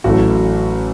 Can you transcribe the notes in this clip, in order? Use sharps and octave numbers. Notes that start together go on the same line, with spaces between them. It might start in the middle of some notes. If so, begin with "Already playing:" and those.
A1 A2 F#3 A3 F#4